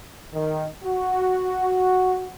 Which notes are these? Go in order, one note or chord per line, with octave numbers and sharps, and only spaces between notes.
D#3
F#4